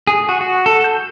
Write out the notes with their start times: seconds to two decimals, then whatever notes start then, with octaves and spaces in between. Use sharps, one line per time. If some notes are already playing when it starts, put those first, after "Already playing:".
0.07 G#4
0.29 F#4
0.41 F#4
0.66 A4
0.84 G6